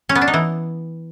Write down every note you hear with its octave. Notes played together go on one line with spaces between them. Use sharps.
C#4
B3
D4
D#4
E3